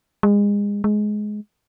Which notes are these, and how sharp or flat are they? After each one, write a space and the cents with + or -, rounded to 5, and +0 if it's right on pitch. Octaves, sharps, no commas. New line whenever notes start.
G#3 -30
G#3 +15